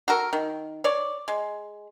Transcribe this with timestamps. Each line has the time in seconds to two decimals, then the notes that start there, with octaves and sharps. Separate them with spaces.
0.08 F#4 A4 A#4
0.33 D#3
0.84 C#5 D5
1.28 G#3